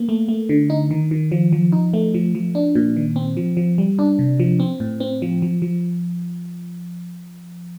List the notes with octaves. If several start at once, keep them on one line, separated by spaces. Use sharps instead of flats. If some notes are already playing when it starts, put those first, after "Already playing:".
Already playing: A#3
A3
A3
D3
D#4
D#3
D#3
F3
F3
D#4
A3
F3
F3
D4
A#2
D#3
C4
F3
F3
G3
D4
C3
F3
C4
A2
C4
F3
F3
F3